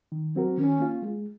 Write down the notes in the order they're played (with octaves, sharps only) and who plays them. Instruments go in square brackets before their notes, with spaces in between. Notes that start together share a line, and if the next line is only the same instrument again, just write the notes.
[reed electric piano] D#3
F#3 C4 F#4 A#4
[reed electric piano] D#3 [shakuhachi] C#4
[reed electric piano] A#3 F4
G#3